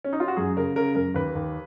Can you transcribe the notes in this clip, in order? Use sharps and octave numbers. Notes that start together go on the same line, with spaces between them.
C#4
D#4
F4
F#4
F#2 G#4
C#3 A#4
C#3 A#4
F#2 A#4
D#2 B4
D#2